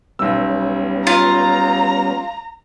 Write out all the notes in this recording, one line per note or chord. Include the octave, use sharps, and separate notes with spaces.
B1 G3 B3 C#4 E6
F4 A#5